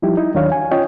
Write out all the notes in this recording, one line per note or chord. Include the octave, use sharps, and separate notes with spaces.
F3 G3 D#4 E4 G4
D#4 E4
D#2 D#3 F#3 D4 C#5 F5
G#5
C#4 F4 C#5 D#5 G5